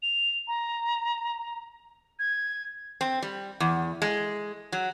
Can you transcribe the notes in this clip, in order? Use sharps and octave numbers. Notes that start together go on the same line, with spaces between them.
F7
A#5
G#6
C4
G3
E2
G#3
F#3